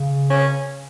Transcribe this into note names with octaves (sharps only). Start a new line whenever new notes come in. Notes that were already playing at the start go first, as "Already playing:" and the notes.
Already playing: C#3
C#4